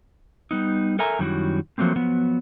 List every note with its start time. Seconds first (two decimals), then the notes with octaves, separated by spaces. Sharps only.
0.51 G3 B3 D#4
0.99 A4 A#4 E5 G#5 A#5
1.19 F#2 D#3 G3 C#4 E4 F#4
1.78 F3 F#3 A3 A#3 C4
1.96 F3 F#3 B3